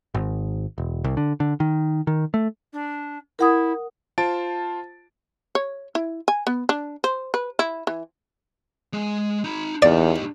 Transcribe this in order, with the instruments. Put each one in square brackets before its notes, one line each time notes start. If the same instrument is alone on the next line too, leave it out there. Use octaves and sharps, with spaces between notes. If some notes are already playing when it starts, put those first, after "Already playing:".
[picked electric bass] G#1
E1
C2
D3
D3
D#3
D#3
A3
[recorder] D4
[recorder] E4 [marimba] A#4 F#5 D#6
[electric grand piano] F4 C5 A5 A6 D7
[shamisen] C#5
E4
G#5
B3
D4
C5
B4
E4
E3
[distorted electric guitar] G#3
D#4 B5
[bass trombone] E2 [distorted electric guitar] D#4 G4 [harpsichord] D5